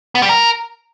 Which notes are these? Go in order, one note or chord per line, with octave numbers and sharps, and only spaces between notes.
B3
G3
A#4